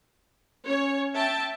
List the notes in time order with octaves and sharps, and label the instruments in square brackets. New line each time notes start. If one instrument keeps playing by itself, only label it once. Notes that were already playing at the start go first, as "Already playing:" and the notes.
[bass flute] C#4 [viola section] C#5
[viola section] E5 G5 A5